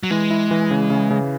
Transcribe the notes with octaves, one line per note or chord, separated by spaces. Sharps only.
F#3
E3 G#3
E4
E3
C#3
C#3
C#3